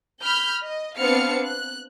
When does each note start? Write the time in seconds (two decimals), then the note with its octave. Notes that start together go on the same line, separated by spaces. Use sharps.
0.23 B5 F6 G6
0.66 D#5
0.98 B3 C4 D4 F5 F6 C#7
1.45 F#6